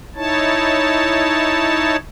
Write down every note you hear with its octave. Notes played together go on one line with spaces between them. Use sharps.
D#4 E4 C#5 A5